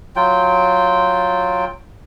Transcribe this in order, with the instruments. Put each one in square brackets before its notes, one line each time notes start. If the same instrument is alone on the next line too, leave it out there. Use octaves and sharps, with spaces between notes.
[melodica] F#3 F4 G5